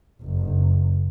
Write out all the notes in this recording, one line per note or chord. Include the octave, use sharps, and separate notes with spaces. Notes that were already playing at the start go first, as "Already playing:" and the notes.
F#1